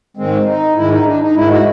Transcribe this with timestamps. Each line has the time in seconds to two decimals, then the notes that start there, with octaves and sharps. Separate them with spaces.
0.17 G#2 D#3 G#3 C4
0.47 D#4
0.76 G#2 D#3 G#3 E4
0.91 D#4
1.06 D4
1.22 D#4
1.36 G#2 D#3 G#3 E4
1.51 F#4